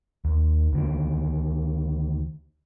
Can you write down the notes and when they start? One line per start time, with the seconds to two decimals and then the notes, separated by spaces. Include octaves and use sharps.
0.25 D#2
0.73 D2 D3 D#3